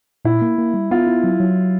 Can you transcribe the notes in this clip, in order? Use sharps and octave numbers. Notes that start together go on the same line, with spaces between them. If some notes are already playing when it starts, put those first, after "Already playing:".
A#2 E4
A#3
A#3
G3
B3 F4
E4
F#3
F#3